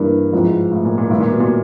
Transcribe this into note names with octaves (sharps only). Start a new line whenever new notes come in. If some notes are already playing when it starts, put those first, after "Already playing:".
Already playing: G2 E3 G3 A#3 D4
G#2 F3 G#3 C4 E4
A2
A#2
A#2
A2 D#3 G3 B3
A#2
B2
A#2